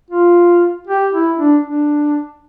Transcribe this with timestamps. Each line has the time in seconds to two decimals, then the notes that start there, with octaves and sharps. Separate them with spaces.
0.11 F4
0.87 G4
1.13 E4
1.38 D4
1.64 D4